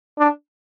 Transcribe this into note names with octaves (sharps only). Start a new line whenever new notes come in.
D4